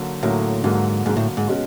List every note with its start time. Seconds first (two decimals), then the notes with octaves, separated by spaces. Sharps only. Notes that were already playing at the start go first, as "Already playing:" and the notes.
Already playing: D3 F#3 A#3
0.23 A2 D3 F#3 A#3
0.63 G#2 D3 F#3 A#3
1.06 G#2 D3 F#3 A#3
1.17 A2
1.37 G#2
1.48 B2 G#3 C#4 F#4